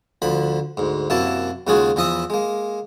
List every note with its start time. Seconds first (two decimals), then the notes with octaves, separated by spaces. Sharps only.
0.22 D2 D3 F3 B5
0.77 D2 G#2
1.10 F#2 C3 F#3 A#3 E4 A5
1.67 D#2 C#3 G#3 F4 F#4 G#4
1.96 E2 E3 F3 D#5 E5 D#6
2.30 G#3 A#3